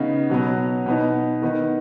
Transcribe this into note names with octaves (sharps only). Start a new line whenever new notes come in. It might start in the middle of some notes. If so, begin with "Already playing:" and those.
Already playing: C#3 B3 D#4
B2 F#3 B3
B2 B3 D#4
D#3 B3 D#4